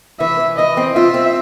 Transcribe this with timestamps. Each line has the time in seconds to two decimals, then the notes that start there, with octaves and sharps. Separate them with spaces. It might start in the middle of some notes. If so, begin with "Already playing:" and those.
0.20 E3 E5
0.40 E3
0.58 E3 D#5
0.77 C4
0.95 F4 E5
1.14 C4